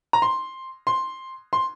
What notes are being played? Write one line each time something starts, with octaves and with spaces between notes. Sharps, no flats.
A#5
C6
C6
C6